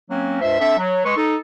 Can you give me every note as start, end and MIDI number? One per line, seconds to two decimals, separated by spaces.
0.10 0.41 54
0.10 0.41 58
0.10 0.41 60
0.10 0.41 61
0.41 0.56 37
0.41 0.56 43
0.41 0.56 72
0.41 0.56 76
0.59 0.75 60
0.59 0.75 62
0.59 0.75 69
0.59 0.75 76
0.78 1.02 54
1.04 1.13 56
1.04 1.13 71
1.04 1.13 84
1.04 1.13 85
1.16 1.36 63
1.16 1.36 69